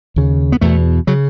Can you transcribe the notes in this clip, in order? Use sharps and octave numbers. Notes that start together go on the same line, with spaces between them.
D#2 C#3
B3
E2 B2 A3
C#3 F#3